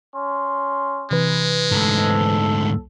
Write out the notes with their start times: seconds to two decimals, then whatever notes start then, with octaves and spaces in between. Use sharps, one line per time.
0.14 C#4 C6
1.11 C3 E3 G#3 B4
1.72 D2 G#2 A4